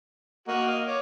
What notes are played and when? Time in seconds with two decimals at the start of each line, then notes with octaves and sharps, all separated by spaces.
0.48 A#3 F#4 A#4 D#5
0.67 D#5 F5
0.86 C#5 D6